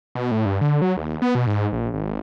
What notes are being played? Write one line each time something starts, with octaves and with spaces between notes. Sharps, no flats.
B2
A2
G2
D3
F#3
D#2
B3
B2
G#2
A#1
G#1
G#1